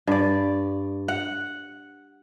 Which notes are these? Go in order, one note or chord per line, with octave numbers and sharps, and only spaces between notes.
G2 D5
F#5